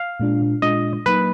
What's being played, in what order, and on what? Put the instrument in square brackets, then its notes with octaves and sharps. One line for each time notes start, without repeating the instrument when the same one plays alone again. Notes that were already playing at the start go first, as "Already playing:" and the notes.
Already playing: [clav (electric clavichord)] F5
[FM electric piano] A#2 G#3 D4 F4
[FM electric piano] A#2 G#3 D4 F4 [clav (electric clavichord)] D#5
[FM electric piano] F#3 A#3 D#4 [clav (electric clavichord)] B4